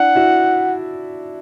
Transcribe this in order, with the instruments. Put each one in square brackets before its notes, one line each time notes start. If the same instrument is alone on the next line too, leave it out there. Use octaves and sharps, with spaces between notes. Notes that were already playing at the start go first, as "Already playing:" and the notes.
Already playing: [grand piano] D4 E4 [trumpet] F#5
[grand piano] E4 F#4